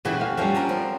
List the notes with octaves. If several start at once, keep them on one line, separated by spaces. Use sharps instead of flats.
A#2 C#3 E3 C#4 F#4 G4
D2 F5
F3 G3 A3 A#3 C#4
C#4 D4 A#4
C4